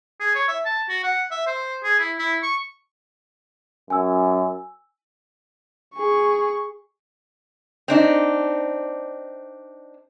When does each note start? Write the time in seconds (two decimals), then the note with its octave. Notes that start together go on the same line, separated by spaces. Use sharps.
0.20 G#4
0.35 C#5
0.48 E5
0.66 A5
0.89 F#4
1.04 F#5
1.31 E5
1.47 C5
1.83 G#4
1.99 E4
2.19 E4
2.43 C#6
3.90 F#2 G#5 E6
5.96 G#4 C#6
7.88 C4 D4 D#4